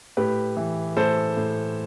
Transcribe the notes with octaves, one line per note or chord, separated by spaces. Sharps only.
A2 G4 B4
E3
A2 A4 C5
A2